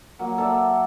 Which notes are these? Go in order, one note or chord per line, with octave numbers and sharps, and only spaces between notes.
F#3 A#3
A4 D5 E5